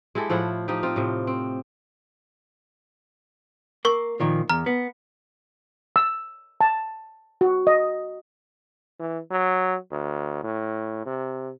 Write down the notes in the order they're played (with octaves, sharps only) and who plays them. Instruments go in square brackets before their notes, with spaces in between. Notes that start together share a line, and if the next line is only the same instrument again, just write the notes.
[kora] G#3 E4 G4 A4
A2 F3 E4 F#5
F3 D#4 G4
C4 F4
A2 C3
C4
[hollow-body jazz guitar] A#3 [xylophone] A#4 C#6
[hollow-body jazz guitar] A#2 D#3 F3
[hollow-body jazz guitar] E2 [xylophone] A#5 F6
[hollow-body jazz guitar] B3
[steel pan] E6
A5
F#4
D#5
[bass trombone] E3
F#3
D2
A2
C3